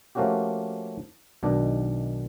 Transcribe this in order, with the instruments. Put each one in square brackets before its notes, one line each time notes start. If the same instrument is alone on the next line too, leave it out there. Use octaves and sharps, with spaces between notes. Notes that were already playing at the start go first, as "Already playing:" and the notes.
[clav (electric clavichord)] F3 A3 A#3 C#4 F#4 G4
B1 B2 D#3 D4